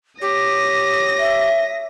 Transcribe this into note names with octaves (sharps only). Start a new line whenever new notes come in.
G4 C#5 D#6 A#6
E5